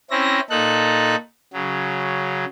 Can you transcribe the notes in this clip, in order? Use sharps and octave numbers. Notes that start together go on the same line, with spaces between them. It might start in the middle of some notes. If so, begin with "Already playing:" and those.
C4 C#4 E4 A#6
A#2 D#4 A4 F#6
C#3 F#3